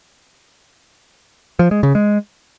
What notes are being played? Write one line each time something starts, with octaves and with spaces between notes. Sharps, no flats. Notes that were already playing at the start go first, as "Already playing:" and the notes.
F3
G#3
C#3
G#3